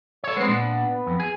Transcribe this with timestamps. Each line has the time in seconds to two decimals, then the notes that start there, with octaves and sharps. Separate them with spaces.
0.24 A4 C#5
0.37 G#3 B3 C4
0.48 A#2 D4
1.07 F2
1.20 G#4